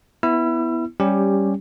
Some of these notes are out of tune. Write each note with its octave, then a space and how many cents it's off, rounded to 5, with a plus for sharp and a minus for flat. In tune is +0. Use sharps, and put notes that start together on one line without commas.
B3 +0 E4 +0 E6 +40
G3 +0 C#4 +0 G4 +10